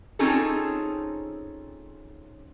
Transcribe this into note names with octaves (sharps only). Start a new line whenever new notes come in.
C4 C#4 D#4 F4 G#4 A4